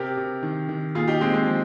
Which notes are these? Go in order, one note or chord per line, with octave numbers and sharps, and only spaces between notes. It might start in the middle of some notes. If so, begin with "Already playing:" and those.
Already playing: C3 G4 A#4
C3
D#3
D#3
A#2 F4 G#4
D#4 G4
A#2 G#3 C4
G#3 C4
F3